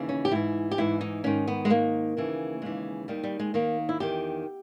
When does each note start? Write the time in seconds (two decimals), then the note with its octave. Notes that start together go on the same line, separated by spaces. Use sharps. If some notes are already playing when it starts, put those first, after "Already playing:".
Already playing: D#2 C#3 E3
0.09 C#4
0.25 G4
0.31 G#2 E3 E4
0.71 G4
0.78 G#2 E3 E4
1.01 D#4
1.24 G#2 D#3 C#4
1.47 B3
1.65 G#3
1.70 G#2 D#3 A#3
2.17 D#2 C#3 E3
2.62 D#2 C#3 E3 G#3
3.08 D#2 D#3 G3
3.24 G3
3.40 G#3
3.54 D#2 D#3 A#3
3.89 E4
4.00 E2 D#3 G4